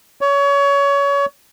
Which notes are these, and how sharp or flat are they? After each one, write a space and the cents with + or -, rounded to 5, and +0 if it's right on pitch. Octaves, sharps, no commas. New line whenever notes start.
C#5 +25